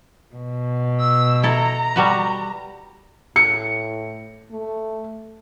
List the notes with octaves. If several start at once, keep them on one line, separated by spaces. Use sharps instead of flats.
B2
E6
E4 A4 A#5
G3 F#4 B4
A2 C#7
A3